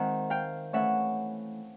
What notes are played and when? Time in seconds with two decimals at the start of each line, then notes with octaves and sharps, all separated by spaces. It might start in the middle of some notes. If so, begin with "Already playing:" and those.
Already playing: D#3 G#3 C4 E5 F#5
0.30 F5 G5
0.73 E3 A3 C#4 E5 F#5